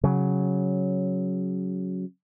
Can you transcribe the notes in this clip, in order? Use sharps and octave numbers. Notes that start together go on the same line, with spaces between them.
C#3 F#3